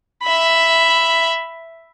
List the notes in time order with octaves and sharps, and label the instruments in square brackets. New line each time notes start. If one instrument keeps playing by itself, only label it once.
[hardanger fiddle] E5 B5